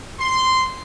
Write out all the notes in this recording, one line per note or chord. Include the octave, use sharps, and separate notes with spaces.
C6